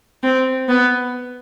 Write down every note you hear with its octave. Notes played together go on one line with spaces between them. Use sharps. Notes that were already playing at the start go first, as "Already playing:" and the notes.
C4
B3